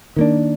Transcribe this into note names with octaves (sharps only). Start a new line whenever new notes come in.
D#3 A#3 D4